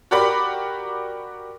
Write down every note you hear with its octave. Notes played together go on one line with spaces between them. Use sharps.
F#4 G4 A#4 D5 B5 D6